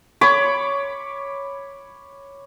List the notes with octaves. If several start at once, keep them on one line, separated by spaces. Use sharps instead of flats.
C#5 B5 D6